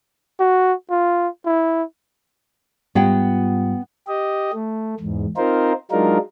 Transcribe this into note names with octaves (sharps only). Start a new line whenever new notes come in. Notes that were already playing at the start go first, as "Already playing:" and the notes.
F#4
F4
E4
G#2 G3 B3 F4 F#5 G5
G4 D#5
A3
E2 G#2
C4 D#4 F4 A#4 C5
F#3 G#3 D4 D#4 F4 A#4